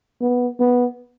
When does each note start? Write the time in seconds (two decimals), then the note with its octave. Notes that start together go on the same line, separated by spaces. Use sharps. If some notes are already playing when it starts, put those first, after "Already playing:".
0.21 B3
0.60 B3